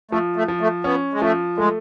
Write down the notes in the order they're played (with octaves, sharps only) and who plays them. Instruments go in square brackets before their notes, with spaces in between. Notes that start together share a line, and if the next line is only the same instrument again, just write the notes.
[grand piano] F3 [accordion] A3
[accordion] A3
[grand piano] F3
[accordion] A3
[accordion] B3 [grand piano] C#4
[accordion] G#3
[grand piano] F3 [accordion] A3
[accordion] G#3 [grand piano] A3